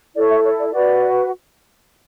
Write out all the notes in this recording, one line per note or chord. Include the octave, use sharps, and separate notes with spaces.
E4 A4 C#5 D5
E5
C#5
D5
F#4 B4 D5